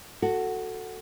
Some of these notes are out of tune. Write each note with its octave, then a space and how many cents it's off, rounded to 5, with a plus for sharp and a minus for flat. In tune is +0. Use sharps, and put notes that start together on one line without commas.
F#4 +0 A4 +15